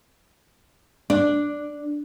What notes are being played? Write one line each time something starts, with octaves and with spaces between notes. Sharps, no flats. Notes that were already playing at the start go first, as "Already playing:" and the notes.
D4